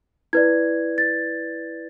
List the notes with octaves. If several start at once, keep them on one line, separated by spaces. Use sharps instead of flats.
E4 B4 D5 G#6
A6